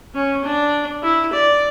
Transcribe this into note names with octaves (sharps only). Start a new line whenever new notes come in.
C#4
D4
E4
D5